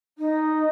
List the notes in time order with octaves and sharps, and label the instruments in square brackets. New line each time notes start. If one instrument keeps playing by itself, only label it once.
[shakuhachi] D#4